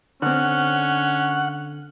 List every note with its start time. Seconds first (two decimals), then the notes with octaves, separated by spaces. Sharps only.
0.22 D3 C4 C#4 F#5